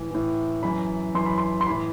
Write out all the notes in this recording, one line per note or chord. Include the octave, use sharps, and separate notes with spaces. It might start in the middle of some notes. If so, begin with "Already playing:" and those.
Already playing: A2 E3
A2 E3
F#2 E3 B5
F#2 E3 C6
B5
C6
C6
A2 E3 B5